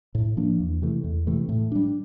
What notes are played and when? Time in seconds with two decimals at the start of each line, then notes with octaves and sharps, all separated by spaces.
0.15 A2
0.37 F3 A#3 D4
0.60 E2
0.82 C3 E3 A3
1.04 E2
1.27 C3 E3 A3
1.49 A2
1.72 G3 D4